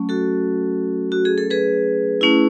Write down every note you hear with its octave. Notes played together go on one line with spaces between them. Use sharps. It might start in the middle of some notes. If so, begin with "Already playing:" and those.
Already playing: F#3 A3 C#4
F#4 A4
F#4
G#4
A4
G#4 B4
A3 C#4 E4